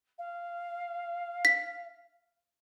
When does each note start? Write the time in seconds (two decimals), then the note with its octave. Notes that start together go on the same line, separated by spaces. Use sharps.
0.18 F5
1.45 B6